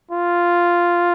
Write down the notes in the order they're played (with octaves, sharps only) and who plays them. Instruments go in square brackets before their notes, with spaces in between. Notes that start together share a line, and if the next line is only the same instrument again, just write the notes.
[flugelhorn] F4